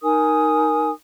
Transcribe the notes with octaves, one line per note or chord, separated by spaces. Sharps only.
D#4 A#4 G#5 D#6